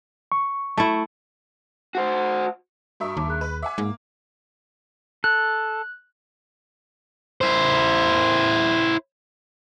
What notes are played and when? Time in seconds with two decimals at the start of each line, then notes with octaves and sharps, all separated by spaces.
0.32 C#6
0.77 A3 E4
1.95 F#4 C5
3.00 G2 F#4 A#4 E5 C#6 D#6
3.17 D#2 A5 D6
3.28 G#4 F#6
3.41 B4
3.62 E5 F#5 G#5 D6
3.78 G#2 A#3
5.24 A4 F#6
7.41 E4 C5